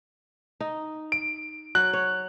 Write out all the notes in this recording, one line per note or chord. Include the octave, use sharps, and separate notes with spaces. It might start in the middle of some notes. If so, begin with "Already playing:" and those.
D#4
D7
F#3 F#6
C#5